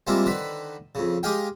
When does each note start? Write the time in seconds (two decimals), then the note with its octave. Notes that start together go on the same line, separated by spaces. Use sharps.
0.07 G3 G#3 A#3 C4 E4 F4
0.26 D3 D#3 B4 C5 B5
0.95 F2 C#3
1.23 G#3 G4 G#4 D#5 F5 G5